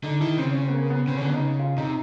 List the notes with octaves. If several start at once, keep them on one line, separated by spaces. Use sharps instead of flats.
D3 D#4
D#3 E4
C#3 C4
C#4
C4
B3
A#3
B3
C#3 C4
D3 C#4
B3
C#3 D#4
F4
C3 D#4